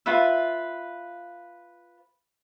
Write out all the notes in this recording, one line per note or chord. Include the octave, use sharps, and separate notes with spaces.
F4 B4 E5